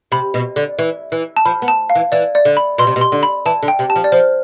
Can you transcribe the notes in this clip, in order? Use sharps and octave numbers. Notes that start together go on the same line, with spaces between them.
C3 B5
B2
D3
E3
E3
A5
F3 B5
B3
A5
F5
E3
E3 D5
D5
D3
B5
B2 C6
C3
B2
C6
D3
B5
E3 A5
D3
G5
C3
A5
F3
D5
F3 C5